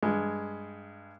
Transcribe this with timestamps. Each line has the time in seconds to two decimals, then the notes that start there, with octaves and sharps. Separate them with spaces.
0.02 G2 G#3